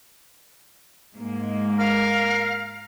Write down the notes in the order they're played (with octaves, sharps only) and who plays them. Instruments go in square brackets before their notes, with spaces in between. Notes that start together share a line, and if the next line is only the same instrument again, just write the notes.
[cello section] G#2 G#3 A#3
[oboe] A#4 [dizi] F5